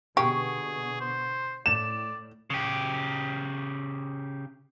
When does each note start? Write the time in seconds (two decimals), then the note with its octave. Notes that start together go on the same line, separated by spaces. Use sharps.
0.17 B2 D3 B3 G4 G#4 C#6
1.00 C5
1.66 A2 D5 E7
2.50 C#3 G4